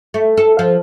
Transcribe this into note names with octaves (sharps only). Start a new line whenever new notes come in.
A3
A4
F3